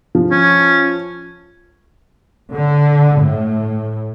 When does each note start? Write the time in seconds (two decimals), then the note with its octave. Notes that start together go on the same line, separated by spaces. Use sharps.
0.15 F3
0.31 C#4
2.51 D3
3.19 A2